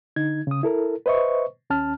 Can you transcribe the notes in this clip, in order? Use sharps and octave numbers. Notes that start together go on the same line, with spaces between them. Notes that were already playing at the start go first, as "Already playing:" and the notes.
D3 D#4 G#6
C#3 D#6
E4 A4 A#4
B4 C5 D#5 E5 C#6
D#2 C#4 A5 F6